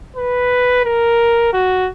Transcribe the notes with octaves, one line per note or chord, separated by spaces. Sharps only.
B4
A#4
F#4